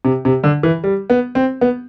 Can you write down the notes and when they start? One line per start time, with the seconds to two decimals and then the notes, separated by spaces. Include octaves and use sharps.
0.05 C3
0.25 C3
0.44 D3
0.63 E3
0.84 G3
1.10 B3
1.35 C4
1.61 B3